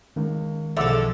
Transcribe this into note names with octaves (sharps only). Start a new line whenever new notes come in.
C#2 D#3
B1 D3 F3 G#3 A4 E5 D6 E6